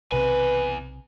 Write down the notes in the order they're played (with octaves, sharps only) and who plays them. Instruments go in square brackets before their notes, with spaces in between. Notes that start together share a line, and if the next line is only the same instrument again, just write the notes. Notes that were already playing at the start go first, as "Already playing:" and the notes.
[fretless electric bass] B1 C3 [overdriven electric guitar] E2 G#5 [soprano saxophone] B4